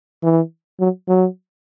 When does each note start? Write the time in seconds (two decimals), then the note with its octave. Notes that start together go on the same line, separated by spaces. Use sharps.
0.23 E3
0.80 F#3
1.08 F#3